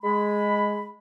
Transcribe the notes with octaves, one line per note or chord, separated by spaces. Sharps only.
G#3 B5